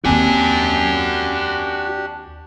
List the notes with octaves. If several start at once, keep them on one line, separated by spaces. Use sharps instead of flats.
D#2 C4 D4 F#4 G4 G#5